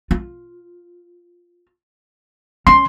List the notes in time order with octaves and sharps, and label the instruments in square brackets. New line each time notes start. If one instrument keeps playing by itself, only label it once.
[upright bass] F4
[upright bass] C#4 [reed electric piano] C6